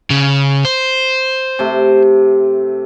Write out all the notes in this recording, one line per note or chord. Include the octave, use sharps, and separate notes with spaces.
C#3
C5
C3 A3